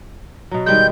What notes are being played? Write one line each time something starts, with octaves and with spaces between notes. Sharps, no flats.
B2 F#3
D#3 G3 G#3 G6